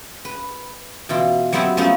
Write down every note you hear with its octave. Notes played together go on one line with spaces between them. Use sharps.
B4
B2 E3 F4
F#3 G3 B3 C4 E4 B4
F3 A3 B3 C#4 D#4